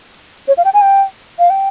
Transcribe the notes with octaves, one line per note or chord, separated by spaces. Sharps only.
C#5
F5
G5
G#5
G5
F5
G5